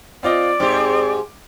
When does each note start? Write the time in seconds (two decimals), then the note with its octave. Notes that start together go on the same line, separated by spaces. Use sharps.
0.23 C4 F4 D5 D#5
0.60 G#2 C4 G4 D6